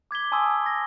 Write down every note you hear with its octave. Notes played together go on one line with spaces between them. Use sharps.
D6 G#6 B6 G7
G#5 A5 C6 D#6 E6
A#6